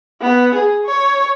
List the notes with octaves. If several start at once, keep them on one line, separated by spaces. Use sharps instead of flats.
B3
G#4
C#5 C#6